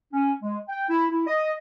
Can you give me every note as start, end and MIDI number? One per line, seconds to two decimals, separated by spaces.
0.13 0.32 61
0.43 0.59 56
0.69 0.84 79
0.90 1.06 64
1.11 1.26 64
1.27 1.53 75